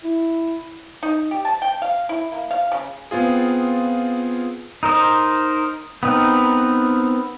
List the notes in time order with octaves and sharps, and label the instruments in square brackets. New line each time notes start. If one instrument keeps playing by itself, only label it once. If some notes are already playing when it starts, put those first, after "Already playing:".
[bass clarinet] E4
[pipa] D#4
G4
A5
G5
F5
E4
A#3
F5
C#3
[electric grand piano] B3 C4 F4 G#4
[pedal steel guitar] D#4 A#4 C5 D#5
B3 C4 D#4 A#4 B4